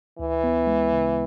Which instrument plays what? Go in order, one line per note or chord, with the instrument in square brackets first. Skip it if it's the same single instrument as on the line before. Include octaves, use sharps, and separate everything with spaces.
[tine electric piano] D2 [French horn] E3
[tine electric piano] B3
G#3
C#3